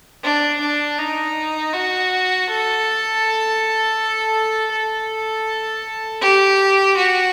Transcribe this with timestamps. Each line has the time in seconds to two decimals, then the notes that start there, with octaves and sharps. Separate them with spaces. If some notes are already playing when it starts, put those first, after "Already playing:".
0.23 D4
0.60 D4
0.98 D#4
1.73 F#4
2.48 A4
4.72 A4
6.22 G4
6.97 F#4